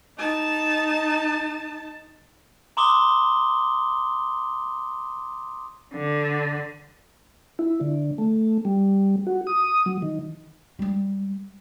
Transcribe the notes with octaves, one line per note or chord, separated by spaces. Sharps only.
D#4 A5
A#5 C6 D6 D#6 G7
D3
E4
D3
A3
G3
F#4
D#6
F#3
D#3
G3 G#3